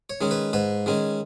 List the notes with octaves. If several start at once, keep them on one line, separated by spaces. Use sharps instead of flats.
C#5
D#3 G#3 C#4
B4
G#2 B4
D#3 G#3 C#4